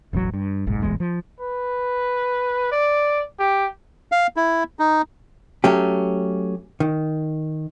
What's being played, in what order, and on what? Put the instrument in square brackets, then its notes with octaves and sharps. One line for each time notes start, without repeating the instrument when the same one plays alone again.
[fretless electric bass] E1 A1 C3 F#3
G2
F#1 B1 G#2
D#1 A1 E2 G#3
F3
[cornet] B4
D5
G4
[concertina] F5
E4
D#4
[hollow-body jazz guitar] F#3 A3 C#4 G4
D#3